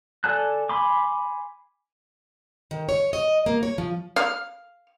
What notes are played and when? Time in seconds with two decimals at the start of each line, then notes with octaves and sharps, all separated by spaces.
0.24 A4 D5 G#5 A5 F#6
0.69 G#5 B5 C6 D6
2.71 D#3
2.89 C#5
3.13 D#5
3.46 A#3
3.63 C#5
3.78 F3
4.16 F5